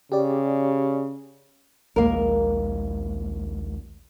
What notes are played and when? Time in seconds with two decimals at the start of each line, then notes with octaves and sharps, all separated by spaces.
0.12 C#3 G4 G#4 D5
1.96 A#1 D#2 G#3 A#3 A#4